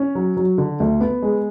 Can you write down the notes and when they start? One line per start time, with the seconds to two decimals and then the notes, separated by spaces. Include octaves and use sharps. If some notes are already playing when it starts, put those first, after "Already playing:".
Already playing: C#4
0.15 F#3
0.37 F#3
0.58 D3
0.80 D2
1.01 B3
1.22 G#3